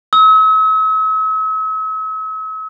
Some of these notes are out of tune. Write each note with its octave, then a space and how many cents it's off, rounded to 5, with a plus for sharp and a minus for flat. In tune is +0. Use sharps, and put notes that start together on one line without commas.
E6 -45